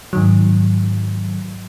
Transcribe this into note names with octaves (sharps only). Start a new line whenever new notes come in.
G#2 D#3 F#3